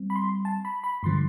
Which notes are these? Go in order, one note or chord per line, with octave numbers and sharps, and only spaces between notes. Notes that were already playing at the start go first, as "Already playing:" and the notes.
Already playing: G3 C4
B5
C6
A5
B5
B5
G2 D3 F3 C6